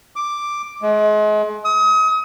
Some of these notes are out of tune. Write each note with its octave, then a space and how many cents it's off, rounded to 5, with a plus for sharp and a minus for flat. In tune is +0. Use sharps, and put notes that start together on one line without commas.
D6 +5
G#3 +35
D#6 +35